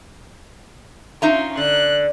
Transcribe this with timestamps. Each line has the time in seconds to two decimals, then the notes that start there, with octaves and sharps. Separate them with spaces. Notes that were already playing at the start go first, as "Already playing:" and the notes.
1.22 C#4 D#4 F4 E5 A#5
1.57 D3 F#6